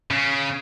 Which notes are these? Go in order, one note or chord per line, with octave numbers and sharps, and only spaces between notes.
C#3